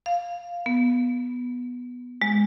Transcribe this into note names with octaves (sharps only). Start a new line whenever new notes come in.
F5
B3
G#3